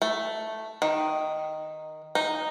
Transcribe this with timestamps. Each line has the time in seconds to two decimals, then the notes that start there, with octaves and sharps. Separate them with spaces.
0.02 A3
0.82 D#3
2.15 D#4